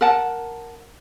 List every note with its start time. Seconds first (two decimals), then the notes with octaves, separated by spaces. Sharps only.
0.01 A#4 F#5 A5